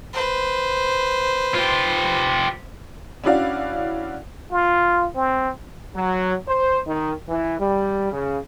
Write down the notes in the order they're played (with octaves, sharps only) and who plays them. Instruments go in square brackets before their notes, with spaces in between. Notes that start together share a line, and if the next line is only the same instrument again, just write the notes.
[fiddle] B4 C5
[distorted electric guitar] F4 G4
[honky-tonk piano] C#4 D4 E4 F#4 D5 F5
[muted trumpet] F4
C4
[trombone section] F#3
C5
D#3
E3
G3
C#3